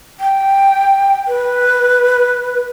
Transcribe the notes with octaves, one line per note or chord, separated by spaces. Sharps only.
G5
B4